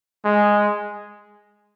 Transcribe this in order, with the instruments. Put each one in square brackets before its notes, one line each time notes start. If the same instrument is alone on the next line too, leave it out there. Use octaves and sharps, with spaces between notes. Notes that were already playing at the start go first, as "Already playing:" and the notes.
[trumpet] G#3